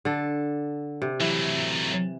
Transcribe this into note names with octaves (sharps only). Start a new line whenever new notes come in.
D3 A4
C3
E3 F#3 A3